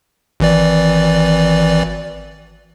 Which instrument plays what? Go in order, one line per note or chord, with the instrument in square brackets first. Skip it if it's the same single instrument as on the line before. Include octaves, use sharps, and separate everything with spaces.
[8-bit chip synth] G#1 E3 D5